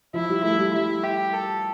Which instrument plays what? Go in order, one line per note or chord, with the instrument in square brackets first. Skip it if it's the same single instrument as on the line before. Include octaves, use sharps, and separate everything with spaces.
[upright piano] F3 [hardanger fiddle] E4
[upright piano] G3
[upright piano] A3 [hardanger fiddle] E4
[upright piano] G3
[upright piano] G3 [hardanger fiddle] E4
[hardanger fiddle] G4
A4